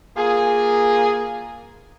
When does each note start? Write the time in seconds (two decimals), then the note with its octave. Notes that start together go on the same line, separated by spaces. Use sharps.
0.17 A#3 F4 G#4